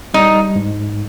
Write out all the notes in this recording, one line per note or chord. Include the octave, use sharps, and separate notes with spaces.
G3 D#4
G#2